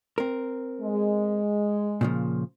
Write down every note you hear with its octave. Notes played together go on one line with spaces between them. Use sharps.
C4 A#4
G#3
A#2 C#3 F3